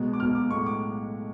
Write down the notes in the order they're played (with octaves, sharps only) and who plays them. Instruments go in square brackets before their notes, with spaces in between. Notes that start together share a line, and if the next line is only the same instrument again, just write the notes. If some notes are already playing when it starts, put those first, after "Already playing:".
Already playing: [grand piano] B1 B2 G#3
D6
B1 B2 G#3 F6
D6
B1 A2 G#3 C#6
D6